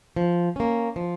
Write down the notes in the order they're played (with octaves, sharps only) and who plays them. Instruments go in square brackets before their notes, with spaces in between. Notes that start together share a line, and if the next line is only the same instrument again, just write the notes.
[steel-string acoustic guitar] F3
A#3 C#4
F3